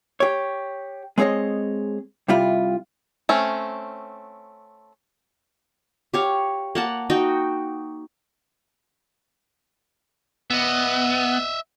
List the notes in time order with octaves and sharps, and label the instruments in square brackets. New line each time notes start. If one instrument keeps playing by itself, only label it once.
[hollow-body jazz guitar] G4 C#5
G#3 C4 G#4 C#5 D#5
C3 G3 E4 F4
[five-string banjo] A3 C4 C#4
[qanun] G4 C#5 F5
A#3 F#5 A5
D#4 F#4 G5
[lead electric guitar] B3 [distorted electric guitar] D#5 E5